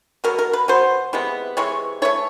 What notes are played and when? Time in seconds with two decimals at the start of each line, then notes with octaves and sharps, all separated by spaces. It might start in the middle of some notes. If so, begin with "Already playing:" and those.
0.24 B2 F#3 B3 A#4
0.39 A#4
0.53 B4
0.68 B2 F#3 B3 C5
1.13 C3 E3 G#3 B3
1.57 C3 E3 G#3 C#5
2.02 E3 A3 C#5